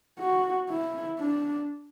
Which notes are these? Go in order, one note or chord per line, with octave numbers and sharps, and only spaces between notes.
F#4
E4
D4